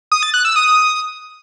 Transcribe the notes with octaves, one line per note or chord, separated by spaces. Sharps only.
D#6
A6
F#6
E6
D#6